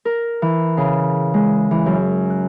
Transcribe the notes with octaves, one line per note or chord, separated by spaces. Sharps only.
A#4
E3
C#3
G#3
E3
F#2
F#6